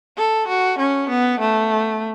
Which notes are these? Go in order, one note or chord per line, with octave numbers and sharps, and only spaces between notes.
A4
F#4
C#4
B3
A3